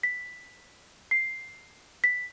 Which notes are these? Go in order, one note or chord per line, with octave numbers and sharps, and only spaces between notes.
B6
C7
B6